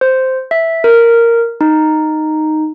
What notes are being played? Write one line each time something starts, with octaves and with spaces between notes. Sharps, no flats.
C5
E5
A#4
D#4